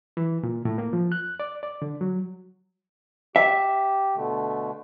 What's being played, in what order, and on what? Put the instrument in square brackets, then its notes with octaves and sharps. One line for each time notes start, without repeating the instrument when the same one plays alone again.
[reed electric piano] E3
A#2
A2
A#3
F3
F#6
D5
D5
D3
F#3
[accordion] G4 [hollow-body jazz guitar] E5
[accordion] B2 D3 A3